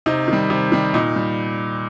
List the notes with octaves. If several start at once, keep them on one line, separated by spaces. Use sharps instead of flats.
C3 D#4
D#3 G3
C3
D#3 G3
A#2 D#4
G3